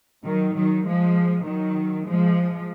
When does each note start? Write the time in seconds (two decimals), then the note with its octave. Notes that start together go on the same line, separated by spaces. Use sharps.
0.25 D#3 F#3
0.55 D#3 F#3
0.86 F3 G#3
1.46 D#3 F#3
2.07 F3 G#3